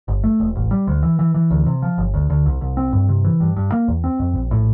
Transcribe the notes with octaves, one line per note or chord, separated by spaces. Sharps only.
G1
A3
E1
A1
G3
D2
E3
E3
E3
D2
C3
F3
G1
D2
D2
C2
C2
C4
G2
C3
E3
G2
G2
A#3
E2
C4
F2
A#1
A2